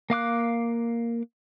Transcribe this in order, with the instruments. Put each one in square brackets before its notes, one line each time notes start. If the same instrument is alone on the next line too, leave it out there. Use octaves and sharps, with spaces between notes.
[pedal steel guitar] A#3 F5 D6 F#6